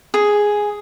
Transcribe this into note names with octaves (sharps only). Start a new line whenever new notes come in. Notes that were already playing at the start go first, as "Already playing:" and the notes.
G#4